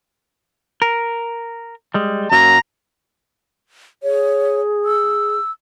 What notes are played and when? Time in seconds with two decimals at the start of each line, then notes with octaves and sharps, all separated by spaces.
0.82 A#4
1.94 G3 G#3
2.32 F#2 F#3 A#3 A#5
4.03 G#4 C#5
4.85 E6